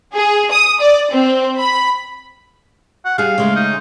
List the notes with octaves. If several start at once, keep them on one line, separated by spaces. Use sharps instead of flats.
G#4
D#6
D5
C4
B5
F#5
G3 G#4 F5
C#3 G#3 A3
D#4